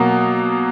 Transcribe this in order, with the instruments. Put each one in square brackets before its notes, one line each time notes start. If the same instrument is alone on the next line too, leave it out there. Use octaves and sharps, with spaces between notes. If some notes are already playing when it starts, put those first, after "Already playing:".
Already playing: [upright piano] B2 F#3 A#3